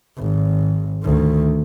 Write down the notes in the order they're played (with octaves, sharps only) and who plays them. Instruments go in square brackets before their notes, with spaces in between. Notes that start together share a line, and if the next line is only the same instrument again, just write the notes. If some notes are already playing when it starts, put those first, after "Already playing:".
[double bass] G#1
D2 D#3